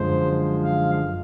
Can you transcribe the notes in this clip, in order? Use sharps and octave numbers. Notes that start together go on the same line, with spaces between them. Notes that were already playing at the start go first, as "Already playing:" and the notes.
Already playing: F#2 D3 F3 G#3 C5
F5